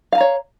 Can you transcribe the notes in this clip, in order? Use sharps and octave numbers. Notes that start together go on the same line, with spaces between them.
C#5 F5 G#5 A#5